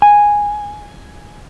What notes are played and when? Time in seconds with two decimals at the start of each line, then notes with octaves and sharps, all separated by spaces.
0.02 G#5